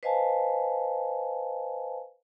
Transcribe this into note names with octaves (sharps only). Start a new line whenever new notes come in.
B4 C5 D#5 F5 G#5 A5